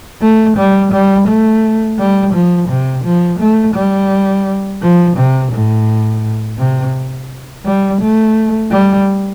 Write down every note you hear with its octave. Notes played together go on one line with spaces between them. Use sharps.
A3
G3
G3
A3
G3
F3
C3
F3
A3
G3
F3
C3
A2
C3
G3
A3
G3